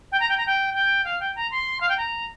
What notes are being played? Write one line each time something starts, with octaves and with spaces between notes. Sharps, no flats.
G5
A#5
G5
A#5
G5
G5
F5
G5
A#5
C6
F5
G5
A#5